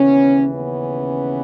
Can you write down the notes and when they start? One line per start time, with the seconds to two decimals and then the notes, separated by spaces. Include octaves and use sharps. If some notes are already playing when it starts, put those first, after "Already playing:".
Already playing: D#2 C#3 E3 B3 C#4
0.54 B3 C#4